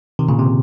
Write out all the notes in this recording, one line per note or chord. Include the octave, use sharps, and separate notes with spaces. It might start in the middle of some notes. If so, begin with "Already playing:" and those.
C3 D#3
A#2 C#3
C3